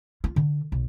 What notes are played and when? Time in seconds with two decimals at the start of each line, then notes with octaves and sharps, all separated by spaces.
0.24 F4
0.36 D3
0.72 B1